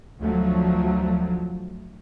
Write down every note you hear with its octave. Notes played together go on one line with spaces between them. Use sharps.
D2 F3 F#3 A3